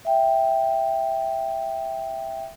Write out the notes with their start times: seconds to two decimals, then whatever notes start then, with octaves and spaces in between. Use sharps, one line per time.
0.05 E5 G5